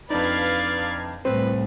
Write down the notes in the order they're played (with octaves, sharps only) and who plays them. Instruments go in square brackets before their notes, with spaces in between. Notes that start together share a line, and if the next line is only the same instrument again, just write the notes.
[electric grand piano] F2 D4 D#4 [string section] B4 F5 G#6 [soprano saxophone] D5
[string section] C2 A2 [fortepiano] C4 [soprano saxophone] B4